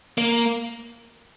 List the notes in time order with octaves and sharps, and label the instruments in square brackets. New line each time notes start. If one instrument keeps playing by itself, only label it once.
[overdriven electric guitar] A#3